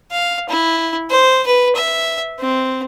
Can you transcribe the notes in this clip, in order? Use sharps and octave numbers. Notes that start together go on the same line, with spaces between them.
F5
E4
C5
B4
E5
C4